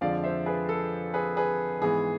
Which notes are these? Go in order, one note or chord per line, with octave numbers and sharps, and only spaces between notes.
F2 D3 F3 G#3 D5 F5
C5 E5
G#4 B4
A4
G#4 B4
G#4 B4
G#2 E3 G#3 B3 G#4